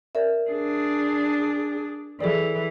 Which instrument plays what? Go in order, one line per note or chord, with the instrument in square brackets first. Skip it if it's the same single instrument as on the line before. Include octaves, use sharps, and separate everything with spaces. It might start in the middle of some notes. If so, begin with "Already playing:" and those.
[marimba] A#4 D5 E5
[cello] D4 G#4
[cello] E3 [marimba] G#4 A4 D5